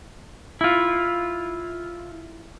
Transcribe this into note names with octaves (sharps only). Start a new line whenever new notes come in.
E4 F4